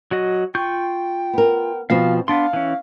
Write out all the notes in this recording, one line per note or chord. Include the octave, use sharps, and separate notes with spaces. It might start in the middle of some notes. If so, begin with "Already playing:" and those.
F#3 F#4 D#5
F4 G5 C#6 G6
B3 A#4
B2 F3 C4 F5
B3 D4 F5 A5 C6
E3 C#4